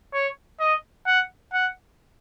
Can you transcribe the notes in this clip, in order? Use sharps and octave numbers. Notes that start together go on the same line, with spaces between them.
C#5
D#5
F#5
F#5